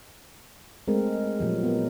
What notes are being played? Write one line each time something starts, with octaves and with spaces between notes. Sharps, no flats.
G#3 A3 C4 A#4
A#2 F3 F#3 G4
B3 A#4